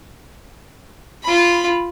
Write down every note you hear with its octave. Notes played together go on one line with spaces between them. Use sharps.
F4 B5